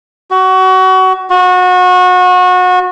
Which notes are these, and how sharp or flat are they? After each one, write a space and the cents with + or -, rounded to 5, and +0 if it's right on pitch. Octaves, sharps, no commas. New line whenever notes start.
F#4 +25
F#4 -25